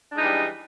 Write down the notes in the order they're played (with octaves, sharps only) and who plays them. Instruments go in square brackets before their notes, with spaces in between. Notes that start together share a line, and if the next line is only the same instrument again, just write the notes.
[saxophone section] D4
G#3
D#4
E3
G3